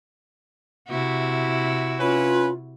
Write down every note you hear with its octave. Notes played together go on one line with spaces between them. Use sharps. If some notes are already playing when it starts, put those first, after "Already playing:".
C3 E4 F#4
C#4 F4 B4